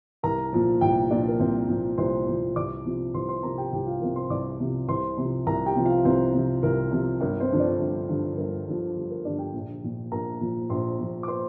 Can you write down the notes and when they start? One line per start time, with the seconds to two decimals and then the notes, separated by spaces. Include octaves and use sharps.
0.23 C2 A#4 A#5
0.53 A#2 F3
0.81 C2 G4 G5
1.10 A#2 F3 D4 D5
1.28 A#4
1.40 C2 C4 C5
1.69 A#2 F3
1.98 C2 C5 C6
2.27 A#2 F3
2.56 C2 D5 D6
2.85 C3 F3
3.14 C2 C5 C6
3.28 C5 C6
3.43 C3 F3 A#4 A#5
3.58 G4 G5
3.72 C2 G4 G5
3.87 F4 F5
4.01 C3 F3 A#4
4.16 C5 C6
4.30 C2 D5 D6
4.60 C3 F3
4.88 C2 C5 C6
5.17 C3 F3
5.46 C2 A#4 A#5
5.66 G4 G5
5.76 C3 F3
5.86 F4 F5
6.05 C2 C4 C5
6.34 C3 F3
6.63 C2 A#4
6.92 C3 F3
7.21 G1 A#4
7.40 C4 C5
7.50 G2 D3 F3
7.60 D4 D5
7.79 G1
8.09 G2 D3 F3
8.37 G1 A#4
8.67 G2 D3 F3
8.96 G1 G4
9.10 A#4
9.25 G2 D3 F3 D4 D5
9.39 G4 G5
9.53 A#1
9.83 A#2 F3
10.12 A#1 A#4 A#5
10.41 A#2 F3
10.70 A#1 C5 C6
10.99 A#2 F3
11.23 D6
11.28 C5 C6